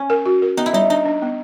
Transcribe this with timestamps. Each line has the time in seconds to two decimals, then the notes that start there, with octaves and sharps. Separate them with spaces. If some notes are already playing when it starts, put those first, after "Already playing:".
Already playing: C#4
0.10 A#4
0.26 F#4
0.42 A#4
0.57 B3 D#4
0.66 E4
0.73 G3 D#4
0.90 D4 D#4
1.06 D4
1.22 B3